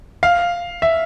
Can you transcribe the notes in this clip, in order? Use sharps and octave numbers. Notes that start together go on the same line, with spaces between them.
F5
E5